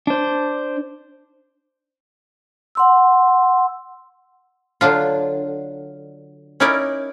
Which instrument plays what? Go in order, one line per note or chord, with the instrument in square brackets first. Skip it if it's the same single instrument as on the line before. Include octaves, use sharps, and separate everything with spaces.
[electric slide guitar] D4 C5
[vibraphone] F#5 C6 E6
[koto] D3 F#3 D4 F4
C#4 D#4 E4 A#4 D5